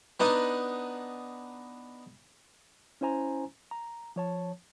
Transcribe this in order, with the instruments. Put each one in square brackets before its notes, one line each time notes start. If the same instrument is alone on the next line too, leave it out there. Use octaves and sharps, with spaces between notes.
[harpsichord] B3 D4 D#4 D#5
[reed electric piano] C#4 E4 C5 G#5 A#5
A#5
F3 C#5 A5